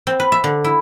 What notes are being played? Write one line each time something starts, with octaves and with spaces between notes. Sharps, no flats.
C4
B4
E5
D3
E4